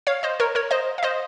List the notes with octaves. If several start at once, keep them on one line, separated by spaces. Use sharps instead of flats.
C#5 F5
C5 D#5
A#4 C#5
A#4 C#5
C5 D#5
F5
C5 D#5